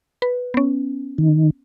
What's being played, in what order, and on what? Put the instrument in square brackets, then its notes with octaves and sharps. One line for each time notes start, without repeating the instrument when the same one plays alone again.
[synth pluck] B4
B3 C#4
[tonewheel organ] D#3